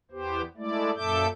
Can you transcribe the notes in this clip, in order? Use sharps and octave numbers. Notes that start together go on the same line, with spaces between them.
E2 B3 G4 C5
G#3 A3 E4 D5
F#2 A#2 A4 E5 D6 G6